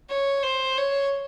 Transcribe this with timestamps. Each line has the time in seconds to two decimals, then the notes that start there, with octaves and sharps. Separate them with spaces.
0.09 C#5
0.43 C5
0.77 C#5